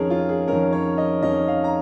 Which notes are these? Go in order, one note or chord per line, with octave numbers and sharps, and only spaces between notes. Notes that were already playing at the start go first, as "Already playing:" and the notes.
Already playing: F2 D#3 C#4 G#4 A#4
F4
G#4
F2 D#3 C#4 A#4
C#5
D#5
F2 D#3 C#4 D#5
F5
A#5